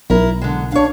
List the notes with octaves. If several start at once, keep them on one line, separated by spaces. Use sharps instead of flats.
B1 E4 A#4
D3 G#3
D4 C#5 F5